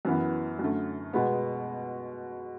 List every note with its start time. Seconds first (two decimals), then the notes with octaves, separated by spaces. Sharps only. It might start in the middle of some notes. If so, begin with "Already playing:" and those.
0.05 F#2 E3 B3
0.59 F#2 D3 A3
1.13 B2 G#3 B3